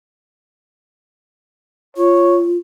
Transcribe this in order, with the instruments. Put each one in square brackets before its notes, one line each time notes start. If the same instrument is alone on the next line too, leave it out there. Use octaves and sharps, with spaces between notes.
[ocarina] F4 [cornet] C#5